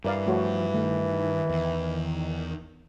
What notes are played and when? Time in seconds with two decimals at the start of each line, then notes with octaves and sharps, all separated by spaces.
0.04 G2 E3 A#4 D5 F5
0.27 F3 A3 F#4 C#5
0.74 D#3 A3
1.49 E2